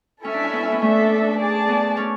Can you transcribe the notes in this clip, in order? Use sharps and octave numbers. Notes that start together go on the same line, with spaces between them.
C#4 E4 A4 E5 G#5
D4
C#4
B3
C#4
B3
A3 D4 A4 E5
G#4 D5 A5
B3
C#4